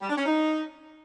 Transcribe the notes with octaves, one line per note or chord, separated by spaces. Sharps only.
G3
D4
C#4
D#4